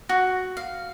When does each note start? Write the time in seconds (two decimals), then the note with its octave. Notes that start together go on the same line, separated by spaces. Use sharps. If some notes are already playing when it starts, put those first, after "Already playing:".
0.09 F#4
0.57 F5